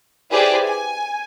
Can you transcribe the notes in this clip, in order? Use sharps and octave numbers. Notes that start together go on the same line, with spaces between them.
E4 G4 G#4 B4 C5 D5
G#5